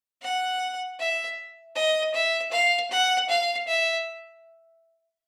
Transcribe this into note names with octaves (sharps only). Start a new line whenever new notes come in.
F#5
E5
D#5
E5
F5
F#5
F5
E5